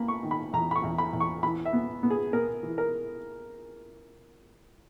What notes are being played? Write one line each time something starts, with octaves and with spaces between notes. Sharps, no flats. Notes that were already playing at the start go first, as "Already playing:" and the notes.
Already playing: A#3 B5
C#6
D#3
B5
E2 A#5
B5
C#6
E2
B5
E2
C#6
E3 B5
E5
B3
B3
G#4
B3 A#4
E3
A#4